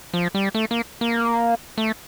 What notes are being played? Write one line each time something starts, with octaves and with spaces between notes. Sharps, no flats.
F3
G3
A3
A#3
A#3
A3